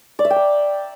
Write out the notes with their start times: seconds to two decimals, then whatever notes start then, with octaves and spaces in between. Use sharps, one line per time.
0.19 D5
0.25 E5
0.30 G5
0.36 A#5